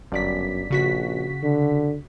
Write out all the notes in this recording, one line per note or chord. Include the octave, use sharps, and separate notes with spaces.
G1 F#2 D5 B6
A#1 C#3 F#4 B6
D3